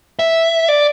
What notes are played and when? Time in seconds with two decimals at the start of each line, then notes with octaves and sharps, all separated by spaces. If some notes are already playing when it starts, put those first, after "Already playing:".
0.19 E5
0.69 D5